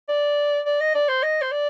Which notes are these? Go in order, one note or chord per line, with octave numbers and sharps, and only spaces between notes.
D5
D5
D#5
D5
C5
D#5
C5
D5